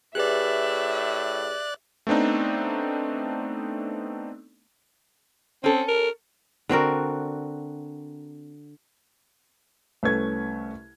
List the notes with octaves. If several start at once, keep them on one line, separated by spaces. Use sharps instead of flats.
A2 G4 G#4 B4 D5 E5 F#6
A3 B3 C4 D4 D#4
C4 C#4 A4
A#4
D3 C4 F#4 A#4
C2 A3 C#4 B4 G#6